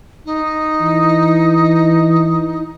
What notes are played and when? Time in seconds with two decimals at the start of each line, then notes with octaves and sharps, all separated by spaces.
0.26 D#4
0.82 E3